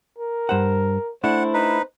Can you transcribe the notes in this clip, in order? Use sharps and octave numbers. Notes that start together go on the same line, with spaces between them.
A#4
G2 C5 F#5
A3 D4 E4 C5 F#5
D#4 B4